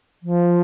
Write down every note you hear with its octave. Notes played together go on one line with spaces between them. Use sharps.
F3